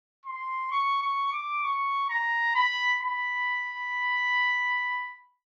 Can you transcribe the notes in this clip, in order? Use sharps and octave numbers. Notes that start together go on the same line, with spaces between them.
C6
C#6
C#6
D6
C#6
A#5
B5
B5